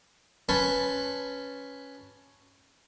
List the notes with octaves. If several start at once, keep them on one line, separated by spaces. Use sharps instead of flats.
C#4 B4 A5 C6 C#6